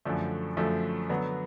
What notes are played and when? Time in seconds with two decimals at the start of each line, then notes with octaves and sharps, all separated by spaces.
0.05 F#2 D3 F3 A3
0.57 F#2 D3 F3 A3
1.09 D3 F#3 B3